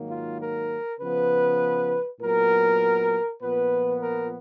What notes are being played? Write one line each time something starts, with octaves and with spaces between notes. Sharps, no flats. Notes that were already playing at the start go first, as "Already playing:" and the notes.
Already playing: G#2 D#3 F#3 A#3
F4
A#4
C#3 F3 B3 B4
A#2 F#3 B3 A#4
A#2 F3 B3 B4
A#4